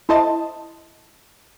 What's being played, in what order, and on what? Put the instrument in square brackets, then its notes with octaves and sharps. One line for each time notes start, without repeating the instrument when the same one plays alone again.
[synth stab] E4 A4 C5 D#5 A5